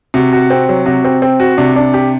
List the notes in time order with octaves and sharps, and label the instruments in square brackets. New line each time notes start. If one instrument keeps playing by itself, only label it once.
[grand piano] C3 [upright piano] F#4
[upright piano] F#4
C4
F#3
[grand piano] C3 [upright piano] F#4
[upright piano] C4
C4
F#4
[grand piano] C3 [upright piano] D4
[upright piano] D4
G4